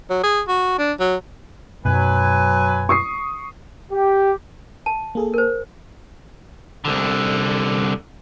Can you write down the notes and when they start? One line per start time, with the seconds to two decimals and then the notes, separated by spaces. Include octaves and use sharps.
0.10 F#3
0.24 G#4
0.48 F#4
0.78 D4
1.00 F#3
1.85 F#2 B2 F#3 B4 G#5
2.89 C#6 D#6 C7
3.92 G4
4.86 A5
5.15 A#3 G#4 A4
5.34 A#4 C5
6.85 C2 D3